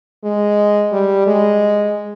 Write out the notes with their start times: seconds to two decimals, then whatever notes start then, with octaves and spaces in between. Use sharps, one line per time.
0.24 G#3
0.92 G3
1.27 G#3